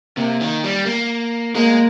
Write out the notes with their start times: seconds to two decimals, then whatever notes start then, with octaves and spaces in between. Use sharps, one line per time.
0.17 C3 A#3
0.41 D#3
0.64 G3
0.86 A#3
1.55 G#3 A#3